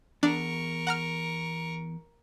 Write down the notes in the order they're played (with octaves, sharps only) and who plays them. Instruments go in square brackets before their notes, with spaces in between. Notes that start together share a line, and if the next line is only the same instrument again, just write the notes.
[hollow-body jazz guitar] E2 [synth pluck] D4 [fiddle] A#4 C#6
[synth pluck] F#5 A#5 F6